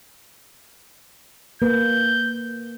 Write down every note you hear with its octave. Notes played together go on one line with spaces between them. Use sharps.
A#3 B4 G6